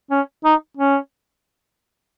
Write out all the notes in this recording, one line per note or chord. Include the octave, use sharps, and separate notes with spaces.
C#4
D#4
C#4